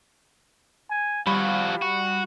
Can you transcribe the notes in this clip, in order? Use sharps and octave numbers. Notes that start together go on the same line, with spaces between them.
G#5
F3 G3 F#4 F5 B5
F#4